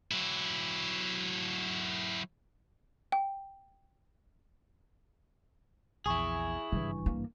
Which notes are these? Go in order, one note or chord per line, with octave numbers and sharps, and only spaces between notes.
F#3 E4
G5
A#1 E2 E4 G#4 G#5 C#6
G#1 G2 C#3 E3
A#3